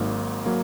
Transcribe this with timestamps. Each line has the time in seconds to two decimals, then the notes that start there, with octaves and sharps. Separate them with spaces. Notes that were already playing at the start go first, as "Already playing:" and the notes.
Already playing: G#1 G#2 F#3 A#3
0.46 F#3 A#3